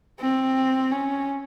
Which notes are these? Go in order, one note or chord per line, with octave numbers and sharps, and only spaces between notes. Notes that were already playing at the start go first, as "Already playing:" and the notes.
C4
C#4